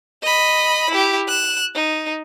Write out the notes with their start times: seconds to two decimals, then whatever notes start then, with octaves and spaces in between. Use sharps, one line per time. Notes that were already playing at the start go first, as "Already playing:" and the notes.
0.23 D#5 B5
0.90 E4 G4
1.28 F#6 E7
1.75 D#4